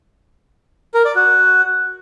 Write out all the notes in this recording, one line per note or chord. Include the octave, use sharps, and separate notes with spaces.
A#4
D5
F#4